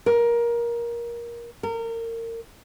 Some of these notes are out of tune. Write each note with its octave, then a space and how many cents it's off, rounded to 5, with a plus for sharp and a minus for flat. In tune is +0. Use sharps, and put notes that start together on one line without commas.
A#4 +20
A#4 -30